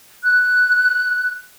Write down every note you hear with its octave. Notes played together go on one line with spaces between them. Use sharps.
F#6